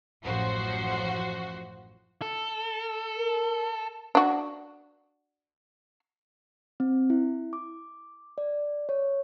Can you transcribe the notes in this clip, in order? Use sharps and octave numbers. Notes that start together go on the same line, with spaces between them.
A1 F#2 F3 F#4 C5
A4
A#4
D4 F#4
C4
E4
D6
D5
C#5